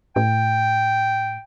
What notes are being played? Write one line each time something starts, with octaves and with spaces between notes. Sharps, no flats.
A2 G5